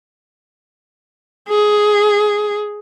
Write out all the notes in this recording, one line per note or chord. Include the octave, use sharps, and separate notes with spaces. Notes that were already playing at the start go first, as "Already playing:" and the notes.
G#4